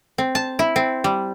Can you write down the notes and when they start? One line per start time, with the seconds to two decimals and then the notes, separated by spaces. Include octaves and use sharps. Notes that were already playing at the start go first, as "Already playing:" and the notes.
0.18 C4
0.35 A5
0.59 E4
0.76 C4
1.04 G3